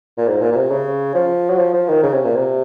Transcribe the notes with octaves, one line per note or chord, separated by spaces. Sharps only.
A#2
G#2
A#2
A#2
C3
C#3
F3
F#3
F3
F3
D#3
C#3
C3
A#2
C3